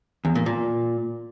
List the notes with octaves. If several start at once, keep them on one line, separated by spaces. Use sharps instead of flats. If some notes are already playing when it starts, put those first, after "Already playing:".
E2
A#2
A#2